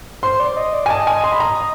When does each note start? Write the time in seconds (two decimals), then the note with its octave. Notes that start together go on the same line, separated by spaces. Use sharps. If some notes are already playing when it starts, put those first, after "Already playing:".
0.23 C5 C6
0.40 D5
0.57 D#5
0.74 D5
0.86 G#5
0.90 D#5 A5
1.07 G#5
1.24 C6
1.32 B5
1.40 A#5